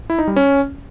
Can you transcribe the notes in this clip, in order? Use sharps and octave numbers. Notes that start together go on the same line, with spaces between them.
E4
D#4
G3
C#4